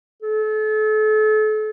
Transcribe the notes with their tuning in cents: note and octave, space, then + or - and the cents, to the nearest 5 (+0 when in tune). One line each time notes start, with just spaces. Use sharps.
A4 -35